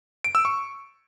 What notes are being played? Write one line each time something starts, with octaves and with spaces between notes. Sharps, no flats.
D7
E6
C#6